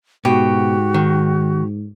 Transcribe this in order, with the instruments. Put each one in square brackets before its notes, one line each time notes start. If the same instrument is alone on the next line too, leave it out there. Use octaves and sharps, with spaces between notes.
[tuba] G#2 [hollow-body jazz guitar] B2 [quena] F#4 [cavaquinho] G4
[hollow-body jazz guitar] D#3